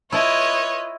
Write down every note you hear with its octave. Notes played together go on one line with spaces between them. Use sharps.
E4 F4 B4 C#5 D#5 A5